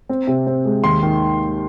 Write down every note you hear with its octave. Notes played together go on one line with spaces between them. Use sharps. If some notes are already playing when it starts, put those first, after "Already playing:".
C4
C3
C4
G#3
D#2 C6
D#3